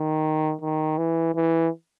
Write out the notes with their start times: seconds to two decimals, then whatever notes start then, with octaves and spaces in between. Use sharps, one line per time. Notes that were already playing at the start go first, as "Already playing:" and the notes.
Already playing: D#3
0.61 D#3
0.98 E3
1.35 E3